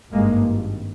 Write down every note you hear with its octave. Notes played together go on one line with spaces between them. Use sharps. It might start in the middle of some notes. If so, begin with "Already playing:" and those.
G#1 G2 G#3 A#3